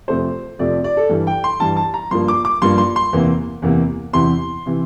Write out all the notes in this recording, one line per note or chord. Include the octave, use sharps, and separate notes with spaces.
F2 C3 F3 A3 C5
F2 C3 F3 A3 D5
D5
A4
G2 E3 G3
G5
C6
G2 E3 G3 A5
A5
A#5
G2 F3 A#3 C6
D6
D6
G2 F3 A#3 C6
C6
C6
E2 C3 E3 A#3
E2 C3 E3 A#3
E2 C3 E3 C6
C3 E3